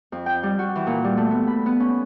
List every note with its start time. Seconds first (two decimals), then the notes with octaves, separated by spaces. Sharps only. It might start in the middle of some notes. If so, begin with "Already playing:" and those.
0.12 F2
0.26 G5
0.43 G3
0.59 F#4
0.75 E3
0.87 A#2
1.04 G3
1.17 A3
1.31 B3
1.47 B5
1.66 B3
1.80 C#4